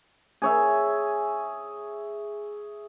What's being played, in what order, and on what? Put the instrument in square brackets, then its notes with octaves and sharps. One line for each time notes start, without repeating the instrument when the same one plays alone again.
[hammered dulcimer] G#4 C#5 E5